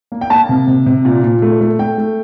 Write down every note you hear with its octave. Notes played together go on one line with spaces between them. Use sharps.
A#3
G5
A#3 A5
C3
C3
C3
A#2
A#2
A3
A3
A3 G5
A3